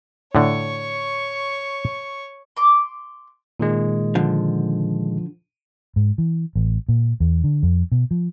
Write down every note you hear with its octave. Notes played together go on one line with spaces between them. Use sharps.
A2 D3 C#5 C#6
C6 D6
A#2 D#3 G#3
D3 F3
G#2
E3
A1
A#2
E2
D3
F2
B2
F3